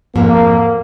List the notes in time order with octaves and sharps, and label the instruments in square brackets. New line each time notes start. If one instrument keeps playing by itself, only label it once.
[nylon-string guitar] F2 G#2 F3 [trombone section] A#3